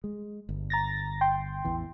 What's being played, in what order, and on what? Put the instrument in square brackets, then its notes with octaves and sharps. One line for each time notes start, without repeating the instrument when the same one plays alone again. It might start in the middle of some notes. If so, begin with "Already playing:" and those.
[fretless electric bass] G#3
G1
[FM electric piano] A#5 A6 A#6
G5 C6
[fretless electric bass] A1 E2 E3